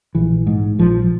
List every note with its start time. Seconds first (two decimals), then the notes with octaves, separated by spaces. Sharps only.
0.15 A#1 E3
0.47 G#2
0.79 A#1 F3